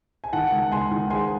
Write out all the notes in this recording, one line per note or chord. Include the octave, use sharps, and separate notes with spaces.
G#5
D#3 F#5 A5
C#2
C#2 G#5 C6
D#3
G#3 G#5 C6